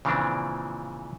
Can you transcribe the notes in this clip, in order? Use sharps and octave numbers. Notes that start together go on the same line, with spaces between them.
A#2 C#3 E3 F3 C4 D4